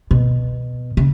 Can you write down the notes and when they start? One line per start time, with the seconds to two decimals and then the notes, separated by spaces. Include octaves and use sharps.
0.11 B2
0.97 C#3